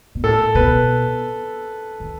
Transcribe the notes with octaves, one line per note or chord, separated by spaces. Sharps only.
B2
A2 A4
B2 B4
D#3